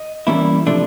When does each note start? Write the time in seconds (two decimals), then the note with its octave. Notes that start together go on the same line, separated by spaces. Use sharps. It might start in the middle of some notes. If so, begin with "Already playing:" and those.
Already playing: D#5
0.27 E3 G3 A#3 C#4 E4
0.66 C3 F3 A3 D4